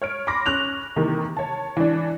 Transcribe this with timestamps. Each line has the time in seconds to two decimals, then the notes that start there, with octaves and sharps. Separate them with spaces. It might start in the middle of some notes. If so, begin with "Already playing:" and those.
0.02 C#5 F6 D7
0.27 B5 C6 D6 A#6
0.46 C#4 F#6 F7
0.96 C3 D#3 E3 A#3
1.37 C#5 A5
1.77 E3 D4